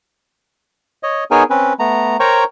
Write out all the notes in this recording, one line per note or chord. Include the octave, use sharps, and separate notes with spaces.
C#5 D#5
B3 D#4 G#4 A#4 C#5 G#5
C4 C#4 B4
A3 B3 A#5
A#4 C5 C#5 G5 A#5 C#6